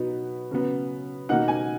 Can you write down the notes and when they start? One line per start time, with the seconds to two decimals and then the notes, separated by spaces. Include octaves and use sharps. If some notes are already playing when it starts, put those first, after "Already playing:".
Already playing: B2 F#3 B3 D#4
0.51 C#3 F#3 B3
1.29 B2 A#3 D#4 F#5
1.48 G#5